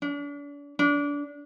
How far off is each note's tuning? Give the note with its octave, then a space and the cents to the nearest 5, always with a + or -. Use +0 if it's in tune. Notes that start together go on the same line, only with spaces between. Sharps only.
D4 -40
D4 -25